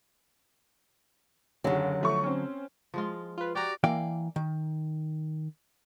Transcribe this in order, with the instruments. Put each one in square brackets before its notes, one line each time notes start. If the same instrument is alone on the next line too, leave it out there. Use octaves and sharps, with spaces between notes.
[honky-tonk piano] F#1 D#2 [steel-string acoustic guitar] D3 F#3
[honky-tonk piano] F3 A3 C#6
C4 C#4
[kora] F3 G#3 F4
[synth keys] F4 B4
[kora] F#4 [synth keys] G4 A#5 [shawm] D5
[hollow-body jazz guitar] E3 A#3 D5 F5 G5
D#3